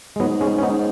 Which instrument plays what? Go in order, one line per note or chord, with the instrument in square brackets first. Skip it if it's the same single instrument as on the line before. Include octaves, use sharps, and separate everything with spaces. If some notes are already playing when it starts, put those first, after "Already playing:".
[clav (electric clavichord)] G#3
[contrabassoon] G#2 [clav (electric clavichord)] F#3 B3
[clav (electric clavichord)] G#3 C#4
C#4
B3 D#4